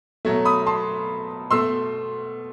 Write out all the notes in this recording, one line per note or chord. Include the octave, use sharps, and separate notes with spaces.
B2 F#3 A3
B5 D#6
A5 C6
B2 A3 C6 E6